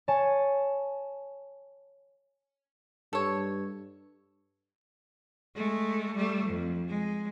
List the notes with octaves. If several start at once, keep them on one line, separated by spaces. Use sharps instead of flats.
C#5 G#5 A5
G2 A4 C#5
G#3 A3
G3 A3
F2
G#3